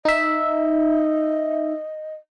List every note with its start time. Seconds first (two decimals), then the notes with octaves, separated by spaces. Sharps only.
0.05 D#4 D#5 E5